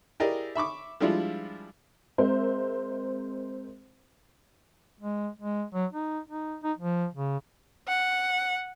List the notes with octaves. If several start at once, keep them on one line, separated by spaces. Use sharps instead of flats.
E4 G4 G#4 A#4 D5 D#5
E5 B5 C#6 D6
F3 G3 G#3 D4 E4 F4
G#3 C4 A#4 C5 E5
G#3
G#3
F#3
D#4
D#4
D#4
F3
C#3
F#5